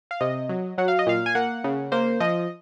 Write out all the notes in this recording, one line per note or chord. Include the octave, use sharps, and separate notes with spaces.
F5
C3 D#5
F#3
F#3 F#5
F5
D#5
A#2 F5
G#5
A#3 F#5
C#3
A#3 C5
F3 D#5